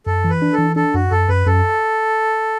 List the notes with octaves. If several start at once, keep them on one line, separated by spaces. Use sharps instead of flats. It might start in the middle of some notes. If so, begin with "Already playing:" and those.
F#2 A4
E3
B4
D4
A4
E3
D4 A4
F#2 F#4
F#2 A4
F#2 B4
F#2 A4